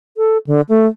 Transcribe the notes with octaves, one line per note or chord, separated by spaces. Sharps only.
A4
D3
A3